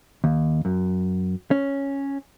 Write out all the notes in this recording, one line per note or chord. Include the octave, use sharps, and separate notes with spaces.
D#2
F#2
C#4